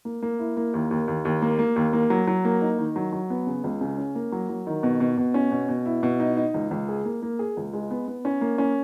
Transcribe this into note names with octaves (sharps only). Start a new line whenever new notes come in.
A#3
A#3
E4
A#3
D#2
D#2
D#2
D#2
A#3
A#3
D#2
A#3
F#3
F#3
A#3
D#4
D#3
F#3
F#3
B3
C#3
C#2
C#3
C#4
A#3
F#3
F#3
D#3
B2
B2
B2
C#4
B2
B2
E4
B2
D#4
D#4
C#2
C#2
G#4
A#3
A#3
G#4
C#2
G#3
B3
B3
C#4
A#3
C#4